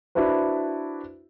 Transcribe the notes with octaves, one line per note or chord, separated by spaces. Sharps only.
D4 E4 F#4 B4 C5